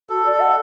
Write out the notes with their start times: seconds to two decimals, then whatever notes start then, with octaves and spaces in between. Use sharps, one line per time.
0.10 F#4 A4
0.26 D5
0.32 A4
0.40 F#5